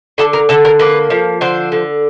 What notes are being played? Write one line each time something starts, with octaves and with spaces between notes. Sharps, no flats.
D3 A4
A#4
D3 A4
A#4
A#3 B4
F3
D3 C5
D3